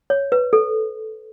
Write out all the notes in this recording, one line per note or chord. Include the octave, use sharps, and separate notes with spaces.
C#5
B4
A4